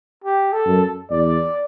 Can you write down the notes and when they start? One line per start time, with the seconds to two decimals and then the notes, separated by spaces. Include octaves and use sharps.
0.24 G4
0.53 A4
0.67 F#2
1.10 E2 D5